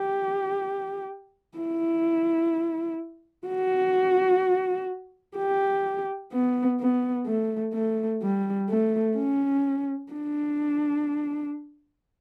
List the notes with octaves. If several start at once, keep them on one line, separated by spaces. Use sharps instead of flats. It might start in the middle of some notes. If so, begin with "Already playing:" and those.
Already playing: G4
E4
F#4
G4
B3
B3
A3
A3
G3
A3
C#4
D4